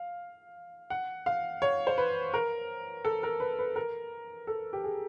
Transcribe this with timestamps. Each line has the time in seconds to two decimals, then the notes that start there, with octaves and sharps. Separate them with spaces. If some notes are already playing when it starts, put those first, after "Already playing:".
Already playing: F5
0.90 F#5
1.26 F5
1.62 C#5
1.87 C5
1.98 B4
2.34 A#4
3.05 A4
3.23 A#4
3.40 B4
3.59 B4
3.76 A#4
4.47 A4
4.73 G4
4.84 G#4